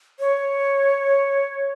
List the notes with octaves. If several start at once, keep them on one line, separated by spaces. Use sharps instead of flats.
C#5